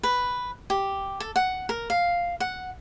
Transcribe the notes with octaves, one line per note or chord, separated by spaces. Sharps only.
B4
G4
A4
F#5
A#4
F5
F#5